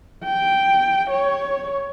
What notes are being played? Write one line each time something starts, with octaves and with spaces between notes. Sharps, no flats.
G5
C#5